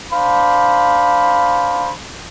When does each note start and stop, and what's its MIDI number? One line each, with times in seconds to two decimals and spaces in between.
0.13 1.92 62
0.13 1.92 72
0.13 1.92 77
0.13 1.92 83